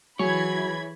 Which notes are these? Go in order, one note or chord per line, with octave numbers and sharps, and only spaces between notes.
E3 F#3 G#4 C#5 B5 G#6